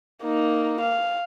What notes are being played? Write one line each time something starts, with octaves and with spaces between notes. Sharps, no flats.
A#3 D#4
F5